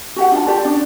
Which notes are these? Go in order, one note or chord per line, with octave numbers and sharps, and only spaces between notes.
F#4 G4 F#5
D4 F4 D#5 A5
F4 G4 D5 A5
C#4 D4 D5